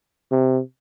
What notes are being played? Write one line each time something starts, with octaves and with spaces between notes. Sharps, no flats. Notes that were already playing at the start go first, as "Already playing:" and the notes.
C3